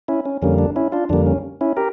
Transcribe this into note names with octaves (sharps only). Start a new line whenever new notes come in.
C#4 E4
C#4
F2 D3 G3 A#3 C#4
D4
C#4 E4
D4 F4
F2 D3 G3 A#3 D4
C#4
C#4 E4
G4 A#4